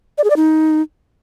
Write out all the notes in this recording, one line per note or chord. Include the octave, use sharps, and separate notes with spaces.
D5
G#4
D5
D#4